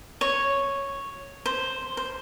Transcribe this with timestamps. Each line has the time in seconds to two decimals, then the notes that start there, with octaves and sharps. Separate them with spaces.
0.21 C#5
1.46 C5
1.97 C5